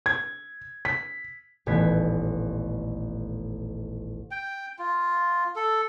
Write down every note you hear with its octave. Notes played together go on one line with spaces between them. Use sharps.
G#6
B6
D#1 A1 B3 G#6 B6
G5
F4
A4